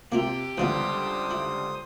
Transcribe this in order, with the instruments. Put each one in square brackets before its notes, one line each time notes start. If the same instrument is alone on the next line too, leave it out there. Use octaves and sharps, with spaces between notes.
[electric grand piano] C3 [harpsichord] A#3 E4 F4 [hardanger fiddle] G4
[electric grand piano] C#2 D3 G3 [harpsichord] E3 F3 B3 [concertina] C5 D#6
[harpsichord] E4